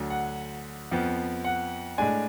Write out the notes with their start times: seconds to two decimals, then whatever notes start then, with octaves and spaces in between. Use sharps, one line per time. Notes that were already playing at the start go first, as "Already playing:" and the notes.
Already playing: D2 D3 F#3
0.10 F#5
0.91 F2 F3 B3
1.44 F#5
1.98 A2 G#3 D4 G#5